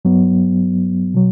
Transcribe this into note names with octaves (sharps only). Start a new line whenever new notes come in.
G2 F#3 B3
B2 F#3